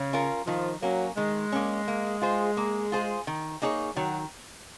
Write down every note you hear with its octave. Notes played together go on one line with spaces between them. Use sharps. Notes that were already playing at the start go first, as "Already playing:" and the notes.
Already playing: C#3
C#4 F4 A#4
D#3 F3
F#3 A#3 C#4
D#3 G#3
A#3 C#4
A#3
F4 G#4 C5
A#3
F4 G#4 C5
D#3
A#3 D#4 G#4 C#5
D#3 F#3